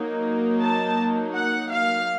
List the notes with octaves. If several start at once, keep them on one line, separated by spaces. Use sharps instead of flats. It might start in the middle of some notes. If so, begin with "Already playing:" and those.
Already playing: F#3 A#3 D#4
A5
F#5
F5